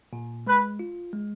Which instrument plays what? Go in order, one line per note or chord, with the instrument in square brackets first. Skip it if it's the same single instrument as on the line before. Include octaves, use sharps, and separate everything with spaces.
[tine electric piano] A#2
[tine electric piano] G#3 [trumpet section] B4
[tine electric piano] F4
G#3